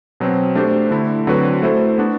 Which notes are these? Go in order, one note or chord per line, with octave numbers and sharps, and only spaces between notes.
B2 F#3 C4
A3 D4 G4 C5
D3 A3 E4
D3 F#3 C4 F#4 B4
A3 E4 A4 C5
B3 D4 F#4